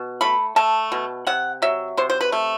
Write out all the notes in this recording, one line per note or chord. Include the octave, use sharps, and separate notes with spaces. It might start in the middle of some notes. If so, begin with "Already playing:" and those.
Already playing: B2
A3 B5
A3 A5
B2
C3 F#5
F#3 E5
C3 C5
C5
B4
A3